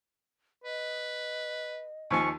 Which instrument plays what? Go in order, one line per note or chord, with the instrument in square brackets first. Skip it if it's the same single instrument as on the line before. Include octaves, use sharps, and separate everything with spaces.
[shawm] B4 [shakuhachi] D#5
[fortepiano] D#2 F3 G#5 [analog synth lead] C#6